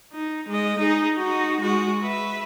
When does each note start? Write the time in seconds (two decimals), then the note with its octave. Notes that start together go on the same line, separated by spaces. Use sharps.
0.13 D#4
0.49 G#3 D#5
0.79 D#4 G#4
1.17 D#4 F#4
1.61 G#3 F#4
2.03 B4 E5